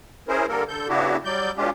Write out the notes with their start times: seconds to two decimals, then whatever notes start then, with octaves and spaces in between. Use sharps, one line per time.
0.28 C#4 E4 G#4 A#4 C5
0.48 D3 G3 A#3 A4 A#4
0.68 D3 A4 G6
0.89 C#3 B3 D4 E4 F#4 G4
1.25 F#3 G3 D5 G6
1.57 B2 G#3 C#4 D4 F4 G4